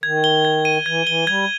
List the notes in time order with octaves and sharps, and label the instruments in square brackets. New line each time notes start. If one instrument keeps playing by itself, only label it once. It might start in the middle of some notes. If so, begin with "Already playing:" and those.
[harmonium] D#3 [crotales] G#6
[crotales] G7
G#6
D#7
[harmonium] E3 [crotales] G#6
[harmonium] E3 [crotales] G7
[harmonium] G3 [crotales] G#6